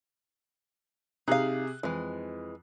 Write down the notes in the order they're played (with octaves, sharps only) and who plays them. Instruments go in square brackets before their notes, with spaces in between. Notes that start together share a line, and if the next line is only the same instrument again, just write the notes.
[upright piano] C3 G#4 F#6 [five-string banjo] D#4 F5
[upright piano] F2 [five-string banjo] E3 G#3